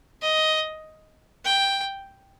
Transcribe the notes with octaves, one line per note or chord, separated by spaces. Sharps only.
D#5
G5